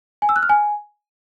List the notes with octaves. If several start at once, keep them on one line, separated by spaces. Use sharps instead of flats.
G#5
E6
F#6
F6
G#5